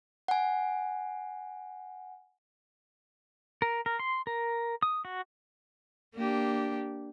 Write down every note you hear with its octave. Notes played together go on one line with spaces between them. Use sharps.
F#5 G#5
A#4
A#4
C6
A#4
D#6
F#4
A#3 D4 G4